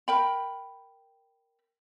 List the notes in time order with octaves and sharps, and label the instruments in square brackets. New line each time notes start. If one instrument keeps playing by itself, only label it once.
[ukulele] A#4 G5 B5